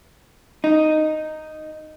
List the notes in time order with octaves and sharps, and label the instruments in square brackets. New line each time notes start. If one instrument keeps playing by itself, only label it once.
[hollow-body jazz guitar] D#4